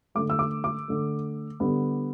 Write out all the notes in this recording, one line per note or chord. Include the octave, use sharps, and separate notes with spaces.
D3 A3 D6
E6
D6
D6
D3 A3
D3 G3 B3